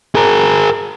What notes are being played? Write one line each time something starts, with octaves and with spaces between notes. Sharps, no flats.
G#4 A#4